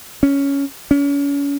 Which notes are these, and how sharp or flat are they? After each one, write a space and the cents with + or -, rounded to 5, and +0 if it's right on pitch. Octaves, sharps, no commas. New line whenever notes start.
C#4 +10
C#4 +35